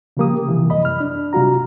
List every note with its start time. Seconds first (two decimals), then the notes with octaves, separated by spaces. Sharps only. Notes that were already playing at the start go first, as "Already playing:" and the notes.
0.17 C#3 F3 G3 A#3 G4 D#6
0.48 C3 E3
0.70 F#2 D#5 B5
0.85 F6
1.00 D4
1.33 C3 G3 F4 F#4 A#5